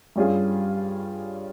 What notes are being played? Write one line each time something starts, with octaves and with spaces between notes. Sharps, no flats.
G2 G3 C#4 F4 G#4